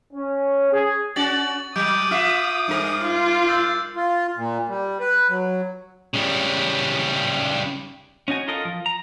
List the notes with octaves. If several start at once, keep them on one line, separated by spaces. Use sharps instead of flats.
C#4
G#4
C#4 F#4 D5 A6 F#7
F#3 D6 D#6 G6 D7
F4 E5 F6 C7
G2 A#4
F4
E6 G6 A6
F4
A#2
G3
B4
F#3
C#3 G3
C#4 D#4 F#4 G#5
F4 A4 A#4 D#5
F3
A#5